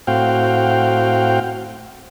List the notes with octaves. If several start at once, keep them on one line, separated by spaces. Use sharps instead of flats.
A2 C4 F#4 F5 G5